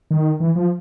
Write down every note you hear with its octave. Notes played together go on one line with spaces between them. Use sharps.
D#3
E3
F3